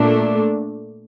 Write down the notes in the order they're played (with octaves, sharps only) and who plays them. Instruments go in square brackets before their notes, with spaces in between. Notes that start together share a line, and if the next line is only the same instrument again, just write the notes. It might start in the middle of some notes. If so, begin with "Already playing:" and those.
Already playing: [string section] A#2 A3 D4